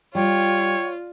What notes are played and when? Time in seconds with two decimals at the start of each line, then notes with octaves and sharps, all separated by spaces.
0.15 G3 F4 C#5 G5